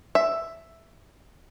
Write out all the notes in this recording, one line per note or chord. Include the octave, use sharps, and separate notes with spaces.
E5